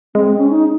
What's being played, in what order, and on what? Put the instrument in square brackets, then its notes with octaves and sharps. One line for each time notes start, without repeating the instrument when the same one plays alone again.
[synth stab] G#3 [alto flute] C4
[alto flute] C#4
D#4